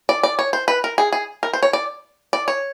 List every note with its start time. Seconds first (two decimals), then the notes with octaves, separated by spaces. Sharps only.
0.09 D5
0.23 D5
0.39 C#5
0.53 C5
0.68 B4
0.84 A#4
0.98 G#4
1.12 G#4
1.43 A#4
1.53 C5
1.63 C#5
1.73 D5
2.33 D5
2.48 C#5